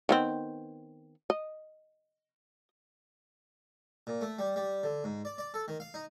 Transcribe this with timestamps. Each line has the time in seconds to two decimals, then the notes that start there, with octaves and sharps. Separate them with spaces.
0.09 D#3 B3 C4
1.30 D#5
4.07 A#2
4.21 A3
4.39 G3
4.56 G3
4.83 D3
5.04 G#2
5.25 D5
5.38 D5
5.54 A4
5.68 D#3
5.80 F5
5.94 D#4